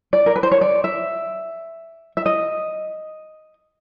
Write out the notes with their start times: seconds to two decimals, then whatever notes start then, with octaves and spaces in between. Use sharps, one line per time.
0.13 D5
0.26 A#4
0.36 B4
0.43 C5
0.52 C#5
0.61 D5
0.84 E5
2.17 E5
2.26 D#5